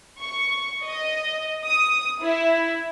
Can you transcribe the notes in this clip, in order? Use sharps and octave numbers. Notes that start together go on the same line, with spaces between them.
C#6
D#5
D#6
E4